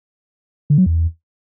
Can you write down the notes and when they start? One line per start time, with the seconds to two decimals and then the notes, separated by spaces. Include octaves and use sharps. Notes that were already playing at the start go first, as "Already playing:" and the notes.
0.70 D3
0.78 F#3
0.86 E2